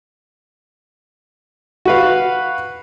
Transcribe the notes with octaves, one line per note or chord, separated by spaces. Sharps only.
F#4 B4 F5